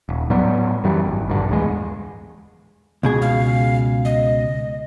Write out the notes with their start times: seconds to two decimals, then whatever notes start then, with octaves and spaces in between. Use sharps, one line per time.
0.09 D#1
0.30 A2 F#3 G3 B3
0.84 F#2 E3 G3
1.06 G#1
1.28 A#1 G2 D3
1.49 D1 E2 G#3
3.03 C#2 B2 G#4
3.22 F5
4.05 D#5